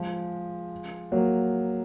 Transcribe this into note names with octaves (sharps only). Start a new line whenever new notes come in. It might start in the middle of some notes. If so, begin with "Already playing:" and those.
Already playing: F3 G#3
F#3 A#3